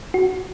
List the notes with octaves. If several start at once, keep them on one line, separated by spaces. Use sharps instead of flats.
F#4